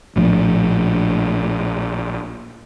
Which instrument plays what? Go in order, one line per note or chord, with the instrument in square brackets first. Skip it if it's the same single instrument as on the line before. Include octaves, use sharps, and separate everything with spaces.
[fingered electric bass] A#1 A2 F3